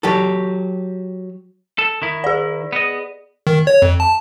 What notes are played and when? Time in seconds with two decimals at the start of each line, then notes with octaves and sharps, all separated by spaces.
0.03 F#3 G4 A4
1.78 A4
2.02 D#3 E4
2.24 G#4 D5
2.73 B3 D#5
3.47 D#3
3.67 C#5
3.82 F2
4.00 A5